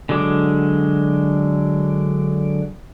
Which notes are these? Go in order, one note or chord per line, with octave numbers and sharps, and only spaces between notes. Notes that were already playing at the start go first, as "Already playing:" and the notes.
D3 F#3 G#3 D6